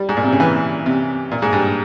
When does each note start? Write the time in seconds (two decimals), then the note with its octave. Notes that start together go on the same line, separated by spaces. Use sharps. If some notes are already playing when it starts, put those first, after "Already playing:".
Already playing: G3
0.09 G#2
0.17 A#2
0.24 C3
0.32 C#3
0.40 E3
0.86 C3
1.31 A#2
1.42 G#2
1.53 G2